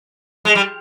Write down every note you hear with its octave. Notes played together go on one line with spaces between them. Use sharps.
G#3
G3